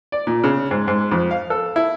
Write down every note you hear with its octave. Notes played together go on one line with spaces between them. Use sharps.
D5
A#2
C#3
G#2
G#2
F2
F5
A4
E4